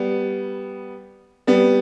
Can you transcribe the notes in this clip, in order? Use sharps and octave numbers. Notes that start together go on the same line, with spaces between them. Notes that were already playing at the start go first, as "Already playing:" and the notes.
Already playing: G3 B3
G3 B3